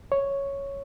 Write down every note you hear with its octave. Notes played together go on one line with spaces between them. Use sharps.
C#5